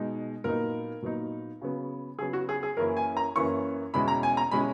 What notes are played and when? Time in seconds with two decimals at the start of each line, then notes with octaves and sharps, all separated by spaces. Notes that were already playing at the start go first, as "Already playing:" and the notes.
Already playing: B2 G#3 D#4
0.44 A#2 F#3 B3 D#4 A#4
1.02 A#2 F#3 B3 D#4
1.61 C#3 F#3 B3
2.19 C#3 F#3 B3 G#4
2.33 F#4
2.49 G#4
2.63 G#4
2.77 F#2 E3 A#3 C#4 E4 A#4
2.97 G#5
3.17 A#5
3.36 F#2 E3 A#3 C#4 E4 C#6
3.94 E2 B2 G#3 C#4 E4 B5
4.08 A#5
4.23 G#5
4.37 A#5
4.51 B2 G#3 C#4 E4 B5